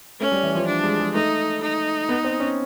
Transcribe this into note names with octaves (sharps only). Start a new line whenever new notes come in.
A3 C#4
G3
E3
F3
D4
G#3
G#3
A3 D#4
D#4
B3
C4
C#4